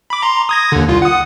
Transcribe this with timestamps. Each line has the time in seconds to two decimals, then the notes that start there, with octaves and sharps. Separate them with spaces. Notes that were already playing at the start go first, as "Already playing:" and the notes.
0.10 B5 D6
0.22 A#5 C6
0.49 D#6 G#6 A#6
0.72 D#2 D3
0.88 C2 F4
1.02 F#5 D#6